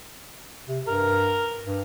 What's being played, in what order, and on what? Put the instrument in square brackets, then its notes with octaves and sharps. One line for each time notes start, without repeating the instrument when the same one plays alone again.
[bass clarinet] C3
[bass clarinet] G2 [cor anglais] A#4
[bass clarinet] G2